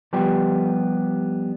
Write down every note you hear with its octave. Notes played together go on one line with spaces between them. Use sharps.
F3 G3 B3 G4